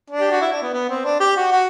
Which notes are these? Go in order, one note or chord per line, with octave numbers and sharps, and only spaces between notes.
D4
G4
F#4
E4
D4
B3
B3
C4
D4
G4
F#4
F#4